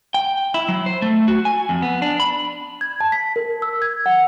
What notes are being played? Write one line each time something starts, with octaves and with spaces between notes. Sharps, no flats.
G5
E4
F#3
C5
A3
F#4
G#5
F2
B3
D4
B5
G#6
A5
B6
A#4
E6
G#6
F#5